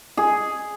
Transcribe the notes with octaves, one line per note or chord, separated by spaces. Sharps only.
G#4